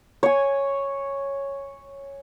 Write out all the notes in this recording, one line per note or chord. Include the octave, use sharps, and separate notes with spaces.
C#5 G#5